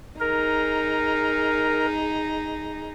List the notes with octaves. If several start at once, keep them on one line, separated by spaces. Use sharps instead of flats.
D#4 G#4 A#4